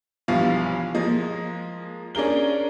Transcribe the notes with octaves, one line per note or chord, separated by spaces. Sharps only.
B1 G2 E3 F3 F5
F3 G#3 A#3 D#5
C#4 D4 G#4 A#4 G7